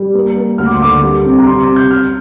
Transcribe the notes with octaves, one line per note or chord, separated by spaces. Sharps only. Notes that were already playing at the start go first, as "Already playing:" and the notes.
Already playing: G3
A#3
A#3
D2 F6
D6
C6
D3 D6
G3
C4
A#5
C3 C6
D6
C3
G6
C3 F6